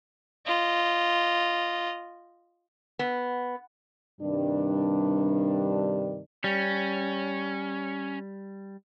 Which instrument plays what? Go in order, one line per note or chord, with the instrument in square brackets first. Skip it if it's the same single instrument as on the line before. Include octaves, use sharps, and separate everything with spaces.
[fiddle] F4 D#5
[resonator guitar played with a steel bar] B3
[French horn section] G2 C3 D#3 G3 D4
[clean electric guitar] G3 [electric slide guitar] C#4